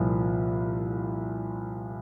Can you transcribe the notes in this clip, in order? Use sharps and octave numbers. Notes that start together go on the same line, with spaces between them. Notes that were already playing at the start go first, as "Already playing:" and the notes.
Already playing: C2 A#2 F3